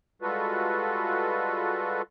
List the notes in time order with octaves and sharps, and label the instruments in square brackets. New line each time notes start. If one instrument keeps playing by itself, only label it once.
[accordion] G3 G#3 F4 F#4 A4 B4